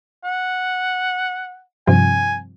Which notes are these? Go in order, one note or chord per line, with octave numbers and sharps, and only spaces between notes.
F#5
G2 C3 F3 G#5